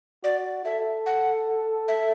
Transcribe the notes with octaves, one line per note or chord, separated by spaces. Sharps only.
F#4 D5
A4 E5
F#5
E5